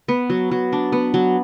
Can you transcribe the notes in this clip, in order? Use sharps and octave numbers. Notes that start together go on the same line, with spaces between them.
B3
F#3
F#3
D4
B3
F#3